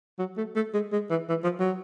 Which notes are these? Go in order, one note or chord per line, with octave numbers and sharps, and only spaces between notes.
F#3
A3
A3
G#3
G#3
E3
E3
F3
F#3